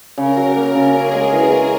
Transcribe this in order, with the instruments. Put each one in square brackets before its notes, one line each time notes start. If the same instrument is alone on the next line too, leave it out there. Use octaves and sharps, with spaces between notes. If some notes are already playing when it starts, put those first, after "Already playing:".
[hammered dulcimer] C#3 [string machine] A#4
[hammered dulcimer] F#3
A#3
C#3
[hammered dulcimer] C#4 [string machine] G#4
[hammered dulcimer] G#3
E3
C#4